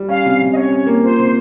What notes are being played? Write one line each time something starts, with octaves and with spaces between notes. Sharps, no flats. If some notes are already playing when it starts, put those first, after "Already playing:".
Already playing: G3
C#4 F5
C3
C3
D#5
C#4 C#5
C#4
A#3
F4 C5
C3